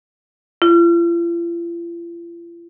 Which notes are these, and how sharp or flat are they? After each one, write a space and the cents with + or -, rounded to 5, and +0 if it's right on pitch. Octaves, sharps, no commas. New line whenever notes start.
F4 -45